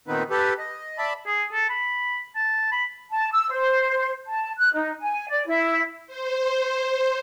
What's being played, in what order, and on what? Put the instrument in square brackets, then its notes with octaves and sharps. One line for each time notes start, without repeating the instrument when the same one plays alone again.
[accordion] A#2 D#3 B3 C4 D#4 B4
G4 A4 B4
D#5
D5 E5 A5 B5
[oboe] G#4
A4
B5
A5
B5
[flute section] A5
E6
C5
A5
F#6
D#4
G#5
D5
E4
[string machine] C5